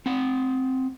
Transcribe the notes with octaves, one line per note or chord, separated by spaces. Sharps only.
C4 F#5